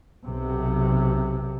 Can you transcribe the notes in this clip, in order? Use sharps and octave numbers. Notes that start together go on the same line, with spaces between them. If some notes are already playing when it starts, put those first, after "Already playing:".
B1 C3